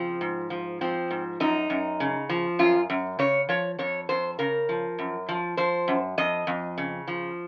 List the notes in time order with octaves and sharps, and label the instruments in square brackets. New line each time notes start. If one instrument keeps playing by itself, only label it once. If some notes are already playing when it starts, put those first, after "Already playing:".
Already playing: [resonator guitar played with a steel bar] C#3 F3 C4
G#2
F3
F3 C4
G#2
F#2 D#4
F#2
C#3
F3
F#2 F4
F#2
C#3 C#5
F3 C#5
F2 C#5
F2 C5
C#3 A#4
F3
F#2
F3
F3 C5
F#2
F2 D#5
F2
C#3
F3